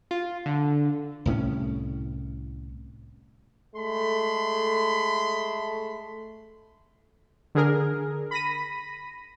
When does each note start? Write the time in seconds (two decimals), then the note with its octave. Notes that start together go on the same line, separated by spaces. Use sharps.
0.11 F4
0.46 D3
1.25 C2 A2 F#3 C#4
3.75 G#3 A3 B5 C6
7.55 D3 G#4 A#4
8.31 B5 A#6 B6 D#7